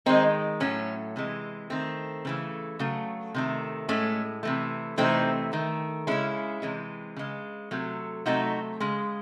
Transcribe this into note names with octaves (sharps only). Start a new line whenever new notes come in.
D#3 G#3 C4 D#4
A2 F#3 A3 C#4
C3 E3 G#3
D#3 A3 C4
C#3 E3 A3
C#3 F#3 A3
C3 D#3 A3
A2 G#3 A3 C#4
C3 E3 A3
C3 E3 A3 C4 D#4
D#3 A3
C#3 G#3 C#4 E4
C3 E3 G#3
C#3 G#3
C3 F#3 A3
C3 F#3 A3 D#4 F#4
C#3 G#3